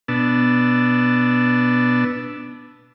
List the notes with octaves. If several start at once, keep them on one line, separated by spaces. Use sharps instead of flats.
B2 B3 D4 A5 E6